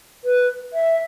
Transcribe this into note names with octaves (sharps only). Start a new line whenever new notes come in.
B4
E5